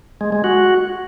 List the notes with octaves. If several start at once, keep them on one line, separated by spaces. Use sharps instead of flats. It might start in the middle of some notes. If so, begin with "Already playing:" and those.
G#3
G#3
F#4